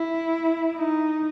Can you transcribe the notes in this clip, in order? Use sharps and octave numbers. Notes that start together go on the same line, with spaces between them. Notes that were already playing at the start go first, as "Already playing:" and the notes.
Already playing: E4
D#4